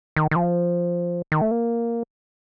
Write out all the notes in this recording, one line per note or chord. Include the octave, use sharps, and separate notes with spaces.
D#3
D#3
F3
D#3
A3
A#3